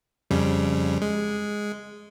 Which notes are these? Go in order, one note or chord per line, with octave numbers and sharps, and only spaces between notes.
F2 C#3 G3
G#3